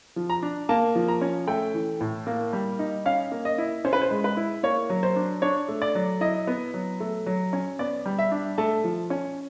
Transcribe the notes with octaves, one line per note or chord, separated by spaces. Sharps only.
F3
A#5
D4
A#3 A5
F3
A#5
C#4
A3 G5
E3
A2
A#3
G3
D#4
C#4 F5
A#3
D#5
E4
C#4 C5
B4
C5
G#3
B4
E4
A#3 C#5
F#3
C5
D4
D4 C#5
A3
D5
F#3
E4 D#5
B3
F#3
A3
F#3
C#4
B3 D5
G3
E5
D4
A3 A5
F3
C#4